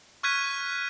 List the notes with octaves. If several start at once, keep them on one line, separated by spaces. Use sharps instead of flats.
C#6 F6 F#6 G#6 B6 D#7